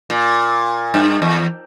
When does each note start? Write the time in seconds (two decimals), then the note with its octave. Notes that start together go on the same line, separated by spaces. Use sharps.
0.10 A#2
0.94 G2
1.22 E2